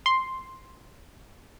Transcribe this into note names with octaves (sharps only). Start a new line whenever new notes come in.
C6